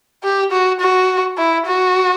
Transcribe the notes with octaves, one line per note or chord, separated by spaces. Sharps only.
G4
F#4
F#4
E4
F#4